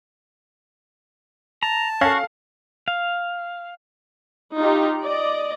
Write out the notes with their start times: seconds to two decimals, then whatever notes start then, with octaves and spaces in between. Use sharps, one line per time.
1.63 A5 A#5
2.01 C#4 F#4 A4 F5
2.88 F5
4.58 D#4 F4 G4
5.03 D5 D#5